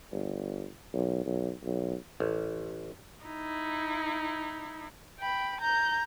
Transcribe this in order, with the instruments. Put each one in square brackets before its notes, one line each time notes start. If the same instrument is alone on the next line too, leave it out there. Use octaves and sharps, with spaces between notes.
[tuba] G1
B1
B1
B1
[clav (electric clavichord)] A1
[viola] D#4 E4
[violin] G5 B5
A#5 G6